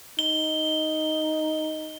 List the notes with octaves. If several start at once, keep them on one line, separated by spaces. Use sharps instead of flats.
D#4 G7